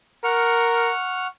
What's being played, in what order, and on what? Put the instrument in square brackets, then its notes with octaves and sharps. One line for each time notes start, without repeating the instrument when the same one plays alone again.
[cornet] A#4 [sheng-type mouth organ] F#5 C#6 F6